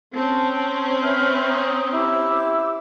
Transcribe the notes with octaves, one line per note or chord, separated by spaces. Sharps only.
C4 C#4 A5
B4 E5 F6
A#5 D#6
E4 G4 D6 E6